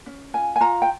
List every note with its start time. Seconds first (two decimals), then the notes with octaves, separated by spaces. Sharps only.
0.06 C#4
0.34 F4 G#5
0.56 G#5
0.61 F4 A#5
0.82 G5